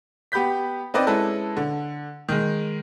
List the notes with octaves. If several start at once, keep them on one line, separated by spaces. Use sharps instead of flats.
B3 G4 B5 G6 B6
C4 D#4 B4 D5 D#5
G#3 C#4 E4 A4 B4
D3
D#3 G#3